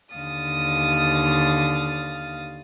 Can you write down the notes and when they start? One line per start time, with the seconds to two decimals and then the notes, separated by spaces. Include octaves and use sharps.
0.15 D#2 D3 F5 D#6 A6